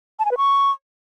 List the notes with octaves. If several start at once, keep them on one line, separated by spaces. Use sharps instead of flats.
A5
G#5
B4
C#6